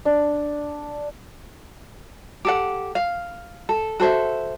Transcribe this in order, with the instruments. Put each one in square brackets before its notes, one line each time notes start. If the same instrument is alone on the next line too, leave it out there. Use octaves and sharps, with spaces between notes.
[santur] D4
[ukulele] G4 A4 F#5
F5
A4
F#4 A4 C5 E5